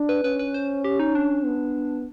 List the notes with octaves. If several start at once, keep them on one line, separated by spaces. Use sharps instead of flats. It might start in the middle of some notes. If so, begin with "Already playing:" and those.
Already playing: D4
B4
C#4 B4
B4
C5
G4
D#4
D4
B3